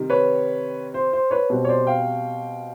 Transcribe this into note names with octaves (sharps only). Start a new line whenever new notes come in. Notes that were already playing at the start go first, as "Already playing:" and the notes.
Already playing: C3 D#3 G3
B4 C#5
C5
C5
B4 C#5
B2 G3 C4
C#5
C5 D5
F5 G5